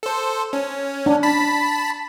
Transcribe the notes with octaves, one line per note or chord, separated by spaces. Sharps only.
A4 C5
C#4
D4
A5 B5 B6